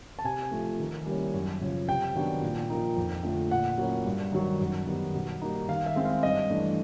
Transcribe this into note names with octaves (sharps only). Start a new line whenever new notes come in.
A5
C3 G#5
F3 A3
D#3
G3 A#3 C#4 E4
F#2
C#3 F3
C3 G5
D#3 F#3 B3 D4
A#2
F3 A#3 D#4
F2
D3 F3 A3
A#2 F#5
F#3 A#3 C#4 E4
G2
D#3 F#3
F#2
D#3 G3 B3
B2
G3 A#3 D#4
D#3 F5
E5
G#3 C4 E4
F5
G2 D#5
E3 A3 D4